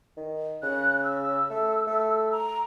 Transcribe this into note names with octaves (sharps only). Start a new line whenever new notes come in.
D#3
C#3 F#6
E6
A3
A3
A#5